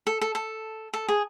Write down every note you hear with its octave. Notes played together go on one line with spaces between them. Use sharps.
A4
A4
A4
A4
G#4